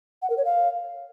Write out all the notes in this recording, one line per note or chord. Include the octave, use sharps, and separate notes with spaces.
F#5
A#4
C#5
F5